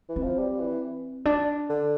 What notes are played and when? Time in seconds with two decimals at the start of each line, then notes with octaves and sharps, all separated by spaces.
0.09 E3
0.16 C4
0.23 F3
0.38 G3
0.60 E3
1.25 D4
1.70 D3